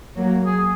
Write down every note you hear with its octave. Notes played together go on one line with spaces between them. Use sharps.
F#3 A#3
G#4